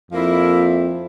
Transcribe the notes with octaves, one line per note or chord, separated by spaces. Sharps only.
F2 F3 A#3 E4